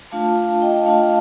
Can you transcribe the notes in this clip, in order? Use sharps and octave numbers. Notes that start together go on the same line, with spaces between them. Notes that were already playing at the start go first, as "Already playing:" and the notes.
A3 D4 F4 F5 A5
D#5 G5
A3 D4 F4 F5 A5